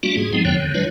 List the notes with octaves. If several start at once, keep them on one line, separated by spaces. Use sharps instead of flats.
G3 A3 A#3 D4 F4 F#4
G#2 G#4
F3 G#3 B3 C4 D#4
F2 D3 F3 B3 C#5 G5
D3 D#3
F#3 G#3 D4 F4 B4 C#5